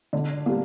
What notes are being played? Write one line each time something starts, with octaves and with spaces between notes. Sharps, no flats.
D3
G3 A#3